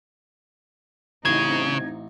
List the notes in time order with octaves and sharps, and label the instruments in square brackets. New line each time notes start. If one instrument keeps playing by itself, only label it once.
[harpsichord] A1 [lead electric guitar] C#3 [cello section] C4 D#4 [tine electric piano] G#6